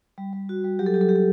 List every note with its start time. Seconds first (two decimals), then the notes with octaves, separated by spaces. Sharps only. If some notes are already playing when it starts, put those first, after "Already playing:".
0.18 G3
0.33 G3
0.49 F#4
0.64 G3
0.79 F#3 G4
0.86 A4
0.94 F#3 G4
1.01 A4
1.09 F#3 G4
1.16 A4